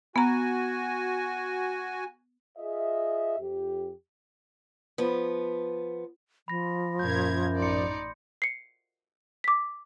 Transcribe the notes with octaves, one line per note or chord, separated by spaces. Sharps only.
B3 F#4 G#5 A#5
F4 G#4 D#5 E5
F2 G4
F3 B3
F3 B5 A#6
F#2 A#2 A#4 G6 G#6
A1 D#4 D5 C6 C#7
C7 C#7
D6 B6